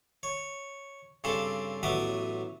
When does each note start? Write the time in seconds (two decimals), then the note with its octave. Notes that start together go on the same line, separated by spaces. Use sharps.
0.23 C#5
1.24 G2 C#3 C4 D4 A4 A5
1.83 A1 F#3 B3 D5 E5 D#6